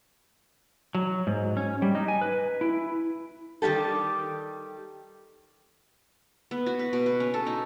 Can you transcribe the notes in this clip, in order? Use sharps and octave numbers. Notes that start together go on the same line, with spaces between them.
F#3
G#2
C#4
G3
D#4
G#5
B4
E4
D#3 G3 C#4 G4 A4
B3
F#4
B4
B2
B4
C#4
A4
D#4